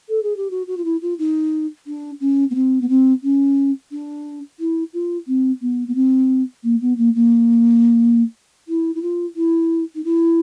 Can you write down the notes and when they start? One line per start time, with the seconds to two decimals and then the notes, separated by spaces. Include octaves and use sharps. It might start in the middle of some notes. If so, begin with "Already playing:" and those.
0.09 A4
0.23 G#4
0.37 G4
0.51 F#4
0.67 F#4
0.77 F4
0.85 E4
1.02 F4
1.19 D#4
1.87 D4
2.20 C#4
2.50 B3
2.55 C4
2.81 B3
2.89 C4
3.23 C#4
3.91 D4
4.59 E4
4.93 F4
5.27 C4
5.61 B3
5.87 B3
5.95 C4
6.63 A#3
6.81 B3
6.97 A#3
7.15 A#3
8.68 E4
8.95 E4
9.02 F4
9.36 E4
9.95 D#4
10.04 E4